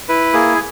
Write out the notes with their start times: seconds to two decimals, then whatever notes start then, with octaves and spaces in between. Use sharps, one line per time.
0.09 E4 B4
0.33 A#3 G#4